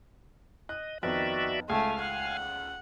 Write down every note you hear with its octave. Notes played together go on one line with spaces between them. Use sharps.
D#5 F#6
F2 D#3 B3 F#4 D5 E5
C#2 A3 F5 G#5
F#5